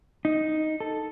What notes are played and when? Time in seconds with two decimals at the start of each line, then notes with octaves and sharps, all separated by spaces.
0.25 D#4
0.80 A4